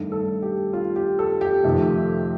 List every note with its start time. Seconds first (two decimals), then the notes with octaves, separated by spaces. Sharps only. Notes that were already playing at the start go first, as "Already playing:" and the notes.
Already playing: G2 D#3 A3 D4
0.12 A4
0.42 G4
0.73 F4
0.96 G4
1.19 A4
1.41 G4
1.64 F2 C3 D#3 A3